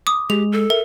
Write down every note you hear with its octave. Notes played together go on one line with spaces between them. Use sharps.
D6 D#6
G#3 G4 F7
A4
A#4 E5